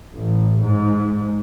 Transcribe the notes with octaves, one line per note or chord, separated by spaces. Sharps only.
A1
G#2